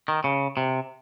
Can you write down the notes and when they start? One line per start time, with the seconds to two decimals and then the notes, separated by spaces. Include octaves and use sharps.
0.08 D#3
0.24 C#3
0.57 C3